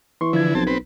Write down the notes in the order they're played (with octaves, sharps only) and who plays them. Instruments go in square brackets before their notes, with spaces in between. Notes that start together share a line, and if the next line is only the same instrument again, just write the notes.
[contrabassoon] E3 [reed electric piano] C6 C#6
[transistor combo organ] D3 E4 [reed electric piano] F3 G#6
[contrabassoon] B1 [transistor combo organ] C4 A5
[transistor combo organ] C4 B4